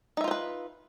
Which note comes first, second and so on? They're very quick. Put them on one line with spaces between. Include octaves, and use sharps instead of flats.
D#4 E5 F4 C5 B4